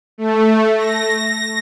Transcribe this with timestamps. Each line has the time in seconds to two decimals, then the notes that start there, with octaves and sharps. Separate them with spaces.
0.18 A3
0.77 A#6